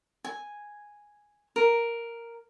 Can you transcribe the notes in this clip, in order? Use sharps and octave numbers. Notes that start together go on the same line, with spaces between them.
G#5
A#4